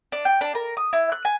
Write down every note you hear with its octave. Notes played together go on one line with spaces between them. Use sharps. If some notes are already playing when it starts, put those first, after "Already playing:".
D4
G5
D4
A#4
D#6
E4
F#6
G#5